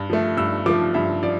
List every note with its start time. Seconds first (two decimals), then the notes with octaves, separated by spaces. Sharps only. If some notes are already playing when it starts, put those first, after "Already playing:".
Already playing: G2
0.10 F3 A3
0.37 G2 E6
0.66 F3 A3 D6
0.94 G2 E5
1.23 F3 D5